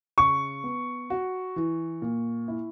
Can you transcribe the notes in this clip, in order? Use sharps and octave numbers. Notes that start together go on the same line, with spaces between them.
C#3 C#6
B3
F#4
E3
A#2
E4